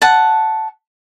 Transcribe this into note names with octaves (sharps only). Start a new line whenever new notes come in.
F#5 A5